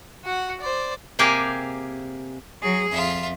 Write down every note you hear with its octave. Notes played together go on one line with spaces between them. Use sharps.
F#4 F#5
C5 D5
C3 A#3 G4 G#4 A#4 G#5
F#3 G#4
F2 F4 E5